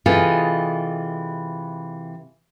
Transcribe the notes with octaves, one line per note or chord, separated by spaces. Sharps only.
C3 E3 F4 G#4 A4 D#5